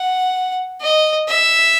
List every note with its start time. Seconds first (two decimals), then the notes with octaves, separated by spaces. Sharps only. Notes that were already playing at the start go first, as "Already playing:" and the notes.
Already playing: F#5
0.81 D#5
1.28 E5